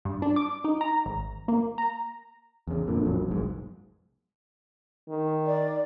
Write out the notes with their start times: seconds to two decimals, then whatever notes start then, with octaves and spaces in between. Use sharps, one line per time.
0.05 G2
0.22 D4
0.36 D6
0.64 D#4
0.81 A#5
1.06 G#1
1.48 A#3
1.78 A#5
2.67 E2 C#3
2.86 G1 F2 A#2 D3
3.06 A#1 F2 F#3
3.28 F1 B1 G#2
5.09 D#3
5.47 D5